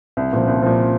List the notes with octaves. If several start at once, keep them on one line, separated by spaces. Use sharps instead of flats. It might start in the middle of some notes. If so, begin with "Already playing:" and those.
C2
A#2 F3
C2
A#2 F3